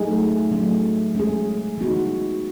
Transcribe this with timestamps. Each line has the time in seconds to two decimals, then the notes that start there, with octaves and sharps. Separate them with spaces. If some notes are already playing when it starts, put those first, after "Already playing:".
Already playing: F#3 A3 D#4 G#4
0.51 F#3 A3 C#4
1.15 G#3 C#4 G#4
1.77 E3 B3 D#4 F#4